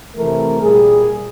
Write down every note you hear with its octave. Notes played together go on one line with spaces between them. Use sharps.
C3 E3 A3 A#4
A#2 G3 G#4